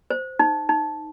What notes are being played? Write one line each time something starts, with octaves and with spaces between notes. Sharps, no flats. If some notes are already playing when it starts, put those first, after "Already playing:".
C5
D#4
D#4